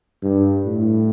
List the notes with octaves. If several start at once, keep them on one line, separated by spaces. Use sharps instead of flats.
G2
A2